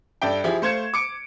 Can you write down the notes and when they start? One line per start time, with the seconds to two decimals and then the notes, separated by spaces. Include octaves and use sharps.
0.22 G2 A4 D5 E5 G5
0.44 F3 E4 G4 G#4
0.62 A3 C5 F5 G#6 C#7 E7
0.94 D6 C#7 D7